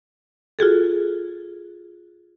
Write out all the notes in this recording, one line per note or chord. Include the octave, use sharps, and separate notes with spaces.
F4 F#4 G#4 A4